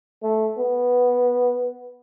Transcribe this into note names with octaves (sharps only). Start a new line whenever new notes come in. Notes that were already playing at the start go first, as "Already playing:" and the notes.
A3
B3